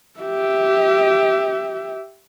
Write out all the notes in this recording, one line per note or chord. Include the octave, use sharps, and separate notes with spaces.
G4 E5